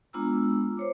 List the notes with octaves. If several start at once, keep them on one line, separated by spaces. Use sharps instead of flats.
G#3 B3 D4 F4 A#5 E6
C5 C#5 D6